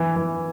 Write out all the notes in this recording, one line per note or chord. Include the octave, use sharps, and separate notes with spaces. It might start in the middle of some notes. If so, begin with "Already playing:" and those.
Already playing: E3
E3